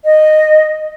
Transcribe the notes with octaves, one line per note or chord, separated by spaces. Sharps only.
D#5